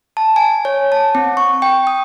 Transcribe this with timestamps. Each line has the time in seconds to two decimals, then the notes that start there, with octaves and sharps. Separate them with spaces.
0.17 A5
0.36 G#5
0.65 C#5
0.92 A5
1.15 C4
1.37 C#6
1.62 G5
1.87 D#6